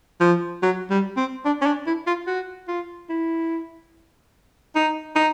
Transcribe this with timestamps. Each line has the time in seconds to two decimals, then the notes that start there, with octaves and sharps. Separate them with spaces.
0.20 F3
0.62 F#3
0.90 G3
1.17 C4
1.45 D4
1.61 C#4
1.66 D4
1.86 E4
2.07 F4
2.27 F#4
2.68 F4
3.09 E4
4.75 D#4
5.16 D#4